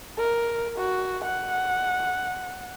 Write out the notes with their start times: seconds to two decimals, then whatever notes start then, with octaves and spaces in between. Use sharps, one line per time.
0.18 A#4
0.78 F#4
1.24 F#5